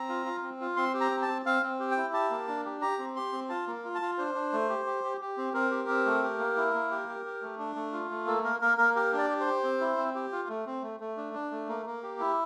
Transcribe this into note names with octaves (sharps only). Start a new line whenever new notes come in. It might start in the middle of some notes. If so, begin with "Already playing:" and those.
Already playing: C4 A#5
F4
F4
C4
F4
C4 C6
G4
A#5
C4
A5
C4
C4 F5
C4
G4
G5
E4
G4 A5
A#3
D4
G4
G4 A#5
C4
G4 C6
C4
F4 A5
A#3
F4
A5
F4
D4 C5
D4
A3
G4
G4
G4
G4
C4
C4 A#4
G4
C4
A3
G4
A#3
E4
A#3
G4
G4
G4
A3
D4
A3
F4
A3
A#3 A4
A#3 A#4
A#3 A#4
A#3 A#4
G4 A#4
D4 D5
G4
C5
G4
C4
E4
C4
G4
F4
A3
C4
A3
A3
D4
D4
A3
A#3
A#3
G4
E4